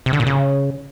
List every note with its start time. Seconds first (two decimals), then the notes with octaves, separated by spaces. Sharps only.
0.06 C3
0.13 D3
0.20 A#2
0.27 C#3